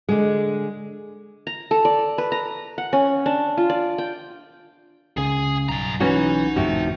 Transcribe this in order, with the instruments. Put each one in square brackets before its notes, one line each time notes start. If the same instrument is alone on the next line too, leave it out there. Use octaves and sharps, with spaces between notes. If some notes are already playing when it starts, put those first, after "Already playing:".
[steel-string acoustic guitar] D3 G#3
[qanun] A#5
A4
D5
B4
A#5
F#5
C#4
D4
F4
D5
G5
[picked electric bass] C#2 C#3 [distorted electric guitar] G#4 G#5
[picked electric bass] B1 [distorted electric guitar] G2 A#5
[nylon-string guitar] E3 C#4 F#4 [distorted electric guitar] D#4
[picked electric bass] G#1 F2 A2 [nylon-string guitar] C3 F3 F#4